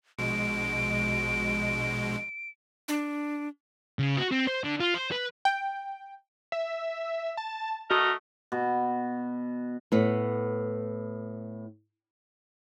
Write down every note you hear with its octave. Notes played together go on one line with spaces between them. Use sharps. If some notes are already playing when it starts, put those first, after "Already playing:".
A#1 B2 G#3 D7
D4
C#3
F#4
C4
C5
D3
F4
C5
B4
G5
E5
A5
A3 F#4 A#4 D#5
B2
A2 B3